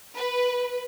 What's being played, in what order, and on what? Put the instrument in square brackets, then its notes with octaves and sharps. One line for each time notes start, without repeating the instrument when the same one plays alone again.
[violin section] B4